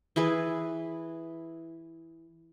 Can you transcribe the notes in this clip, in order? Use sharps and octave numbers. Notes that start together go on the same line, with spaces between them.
E3 E4 G#4 B4